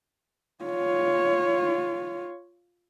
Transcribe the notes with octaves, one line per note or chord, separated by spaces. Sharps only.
F4 C#5